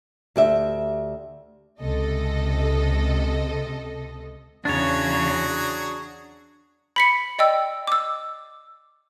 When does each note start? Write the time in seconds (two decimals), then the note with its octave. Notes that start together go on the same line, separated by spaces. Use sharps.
0.36 D2 G4 E5
1.80 C#2 C3 A4 D#5
4.65 E2 C#3 F#3 D4 F#4 G#4 C#5
6.96 B5 B6 C#7
7.39 D5 D#5 G5 E6
7.87 D6 E6